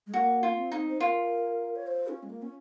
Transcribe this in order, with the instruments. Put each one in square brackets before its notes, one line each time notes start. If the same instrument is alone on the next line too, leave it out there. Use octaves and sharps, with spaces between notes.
[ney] G#3
[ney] A#3 [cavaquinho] F#4
[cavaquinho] F4
[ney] C4
[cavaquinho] D#4
[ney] C5
[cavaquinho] F4 [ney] A#4
[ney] C#5
C5
C#4
G#3
A#3
C#4